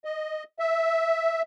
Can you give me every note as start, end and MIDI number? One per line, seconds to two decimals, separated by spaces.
0.05 0.43 75
0.59 1.42 76